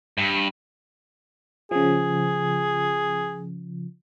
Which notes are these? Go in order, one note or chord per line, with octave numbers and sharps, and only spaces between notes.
G2
C#3 F3 G#4